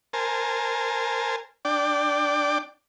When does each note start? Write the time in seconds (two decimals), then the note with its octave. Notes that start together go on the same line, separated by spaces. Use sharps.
0.13 A#4 C5 G#5 A5
1.65 D4 D5 G5